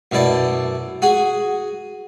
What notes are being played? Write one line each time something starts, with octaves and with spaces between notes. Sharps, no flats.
F#2 B2 E4 D5 A5
F#4 G#4